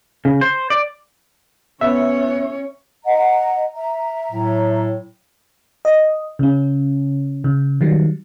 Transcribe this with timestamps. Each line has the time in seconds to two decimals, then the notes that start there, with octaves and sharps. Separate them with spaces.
0.25 C#3
0.41 C5
0.70 D5
1.81 B3 C#4 C#5 E5
3.05 D#5 F#5 A#5
3.75 E5 A#5
4.32 A2 F#3
5.85 D#5
6.39 C#3 C#4
7.44 C#3
7.81 D#3 F#3 G3